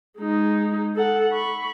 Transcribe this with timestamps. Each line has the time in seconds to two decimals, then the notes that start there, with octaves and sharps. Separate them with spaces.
0.19 G#3 D#4
0.96 A4 F#5
1.32 B5 C#6